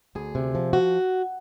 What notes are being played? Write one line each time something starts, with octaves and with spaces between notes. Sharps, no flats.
D2 G#4
C3
F3
F#4